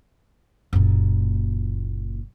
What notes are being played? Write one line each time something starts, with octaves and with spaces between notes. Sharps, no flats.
F#1 A#2